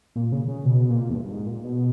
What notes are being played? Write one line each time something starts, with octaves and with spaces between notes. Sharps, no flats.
A#2
C#3
C#3
B2
A#2
E2
G2
G2
G#2
A#2
B2